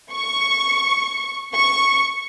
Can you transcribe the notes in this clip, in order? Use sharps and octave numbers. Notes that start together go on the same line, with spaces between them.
C#6
C#6